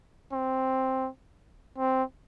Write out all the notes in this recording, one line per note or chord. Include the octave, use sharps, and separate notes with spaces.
C4
C4